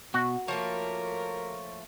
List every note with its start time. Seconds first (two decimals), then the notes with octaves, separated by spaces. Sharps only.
0.14 B2 F#4
0.48 F3 A3 A#3 A#4 C#5